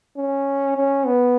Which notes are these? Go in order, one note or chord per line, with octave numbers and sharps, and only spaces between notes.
C#4
C#4
B3